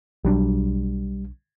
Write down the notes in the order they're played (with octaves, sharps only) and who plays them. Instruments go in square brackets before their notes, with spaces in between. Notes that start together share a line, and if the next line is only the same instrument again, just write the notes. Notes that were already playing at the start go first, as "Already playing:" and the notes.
[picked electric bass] B1 F#3 D4 [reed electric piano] G3